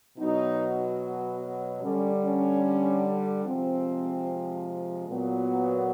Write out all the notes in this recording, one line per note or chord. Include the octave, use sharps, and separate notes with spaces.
B2 F#3 D#4
D3 G3 C#4
C#4
C3 F3 G#3 C4
A#2 F#3 B3